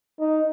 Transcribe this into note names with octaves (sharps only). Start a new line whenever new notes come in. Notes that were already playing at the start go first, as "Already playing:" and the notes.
D#4